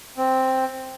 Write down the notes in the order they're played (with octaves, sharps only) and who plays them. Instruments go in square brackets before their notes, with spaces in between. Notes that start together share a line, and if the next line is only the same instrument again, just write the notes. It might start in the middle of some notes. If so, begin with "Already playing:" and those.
[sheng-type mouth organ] C4